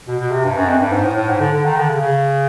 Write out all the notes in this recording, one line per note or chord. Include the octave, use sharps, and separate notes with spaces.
B2
B2
C3
G2
F#2
F2
G2
G#2
A2
A2
G#2
D3
D3
D#3
D3
C#3
C#3